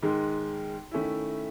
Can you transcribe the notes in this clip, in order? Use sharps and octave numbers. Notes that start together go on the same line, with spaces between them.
G#2 D#3 G#3
D#3 A3 C#4 E4